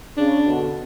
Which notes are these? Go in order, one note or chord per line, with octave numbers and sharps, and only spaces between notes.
C#3 D4
B2 D3